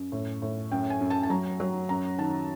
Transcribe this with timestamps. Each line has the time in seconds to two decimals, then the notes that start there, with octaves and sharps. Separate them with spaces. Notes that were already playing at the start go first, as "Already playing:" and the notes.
Already playing: F#2
0.12 A2
0.42 A2
0.72 F#2 G5
0.90 G#5
1.01 F#2
1.10 A5
1.23 A5
1.30 F#3 A#5
1.60 F#3
1.89 F#2 A#5
2.18 D#3 A5